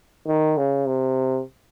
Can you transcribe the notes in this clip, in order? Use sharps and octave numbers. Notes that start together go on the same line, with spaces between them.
D#3
C#3
C3